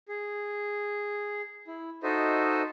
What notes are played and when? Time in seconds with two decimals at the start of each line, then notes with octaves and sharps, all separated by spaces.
0.09 G#4
1.68 E4
2.03 D#4 F#4 A4 C5 D#5 E5